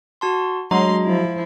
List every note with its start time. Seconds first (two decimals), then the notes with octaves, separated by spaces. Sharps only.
0.21 F#4 A5 C6
0.71 F#3 G#3 D4 D#5 A#5 C6
1.04 F3 E4